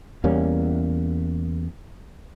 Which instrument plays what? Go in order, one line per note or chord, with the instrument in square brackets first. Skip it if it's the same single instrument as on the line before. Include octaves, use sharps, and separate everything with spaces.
[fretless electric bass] E2 G3 A#3 C#4